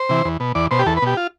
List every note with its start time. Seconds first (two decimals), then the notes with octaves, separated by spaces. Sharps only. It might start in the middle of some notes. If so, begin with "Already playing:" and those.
Already playing: C5
0.09 C3 E3
0.25 E2
0.40 B2
0.55 E2 D5
0.71 B2 C5
0.79 G4
0.86 E2 A4
0.97 B4
1.02 B2 G4
1.17 F4